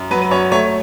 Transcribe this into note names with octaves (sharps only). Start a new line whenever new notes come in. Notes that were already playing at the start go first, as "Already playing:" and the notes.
Already playing: F#2
F#3 B4
B4
F#2 C#5
A3 C#5